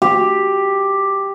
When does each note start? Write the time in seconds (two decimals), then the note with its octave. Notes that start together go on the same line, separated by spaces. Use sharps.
0.02 G4